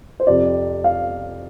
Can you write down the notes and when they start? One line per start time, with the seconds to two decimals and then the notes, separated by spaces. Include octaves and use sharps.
0.20 C5
0.27 F2 C3 D5
0.84 F5